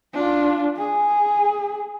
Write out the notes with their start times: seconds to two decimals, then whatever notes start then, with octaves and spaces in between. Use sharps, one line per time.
0.14 D4 F4
0.77 G#4